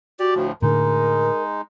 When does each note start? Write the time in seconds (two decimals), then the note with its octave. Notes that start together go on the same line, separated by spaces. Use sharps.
0.20 F#4 G4 D5
0.35 D2 A2 F3
0.62 A2 D3 G#3 D#4 A#4